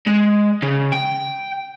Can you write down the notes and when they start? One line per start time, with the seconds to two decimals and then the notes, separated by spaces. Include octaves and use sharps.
0.07 G#3
0.62 C#3
0.92 G5